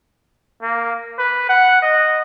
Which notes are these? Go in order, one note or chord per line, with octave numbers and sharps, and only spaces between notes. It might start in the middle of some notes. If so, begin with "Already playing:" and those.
A#3
B4
F#5
D#5